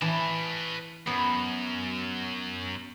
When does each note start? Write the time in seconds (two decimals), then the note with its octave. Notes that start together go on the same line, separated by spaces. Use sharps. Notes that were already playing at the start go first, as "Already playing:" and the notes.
0.02 E3 B4 A5
1.07 F#2 B3